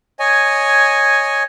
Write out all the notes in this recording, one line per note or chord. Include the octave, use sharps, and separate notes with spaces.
C#5 D#5 G#5